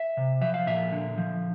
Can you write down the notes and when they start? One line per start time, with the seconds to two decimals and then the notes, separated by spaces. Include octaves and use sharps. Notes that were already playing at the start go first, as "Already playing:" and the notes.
Already playing: E5
0.17 C3
0.41 F3 E5
0.54 F5
0.67 A#2 E5
0.93 D3
1.18 F3